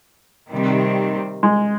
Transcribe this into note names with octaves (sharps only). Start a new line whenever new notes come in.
C3 D#3 G3 C4
G#3